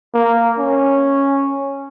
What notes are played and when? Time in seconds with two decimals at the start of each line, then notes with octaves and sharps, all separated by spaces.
0.14 A#3
0.59 C#4